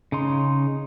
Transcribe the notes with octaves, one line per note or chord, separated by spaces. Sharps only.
C#3 D#4 C6